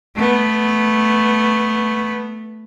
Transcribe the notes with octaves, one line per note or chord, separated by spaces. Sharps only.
A3 B3